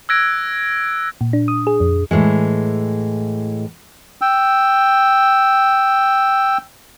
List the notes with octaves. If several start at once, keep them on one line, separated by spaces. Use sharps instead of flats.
E6 F#6 G#6 A#6 D7
A#2
D4
D#6
G#4
F2
A2 E3 G#3
G5 E6